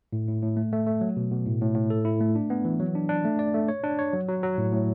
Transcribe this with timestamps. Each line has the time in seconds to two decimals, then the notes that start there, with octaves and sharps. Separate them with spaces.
0.13 A2
0.28 A2
0.43 A2
0.57 A3
0.73 A3
0.87 A3
1.01 F#3
1.17 B2
1.31 B2
1.47 A2
1.61 A2
1.76 A2
1.90 A4
2.05 E4
2.21 A3
2.35 D4
2.50 B3
2.65 E3
2.80 F#3
2.95 D4
3.09 D4
3.25 A3
3.39 D5
3.54 A3
3.68 C#5
3.83 D4
3.99 C#5
4.13 F#3
4.28 F#3
4.43 F#3
4.58 A2
4.72 A2